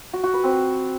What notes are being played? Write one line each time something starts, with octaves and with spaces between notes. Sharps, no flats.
F#4
F#4
B4
C4